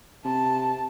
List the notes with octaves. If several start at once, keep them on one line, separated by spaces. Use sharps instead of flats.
C3 A5